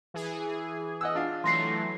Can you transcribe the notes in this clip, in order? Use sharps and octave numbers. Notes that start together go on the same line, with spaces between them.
E3 G#4
D#5 F#5 E6
D4 F4
E3 F#3 A3 C6 A#6 C7